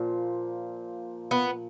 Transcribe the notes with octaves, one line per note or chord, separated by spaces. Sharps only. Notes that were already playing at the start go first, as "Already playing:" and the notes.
Already playing: A#2 F3
B3